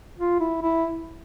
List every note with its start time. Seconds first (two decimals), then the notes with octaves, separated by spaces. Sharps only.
0.18 F4
0.40 E4
0.62 E4